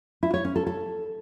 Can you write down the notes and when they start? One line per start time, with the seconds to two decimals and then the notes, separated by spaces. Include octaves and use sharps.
0.23 E4
0.34 C#5
0.45 C#4
0.56 A4
0.67 A4